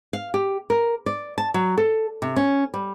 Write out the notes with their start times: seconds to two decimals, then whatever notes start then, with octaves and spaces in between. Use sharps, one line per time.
0.13 F5
0.34 G4
0.70 A#4
1.06 D5
1.38 A5
1.54 F#3
1.78 A4
2.22 C3
2.36 C#4
2.74 G3